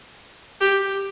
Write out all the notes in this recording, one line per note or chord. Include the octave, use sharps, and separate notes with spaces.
G4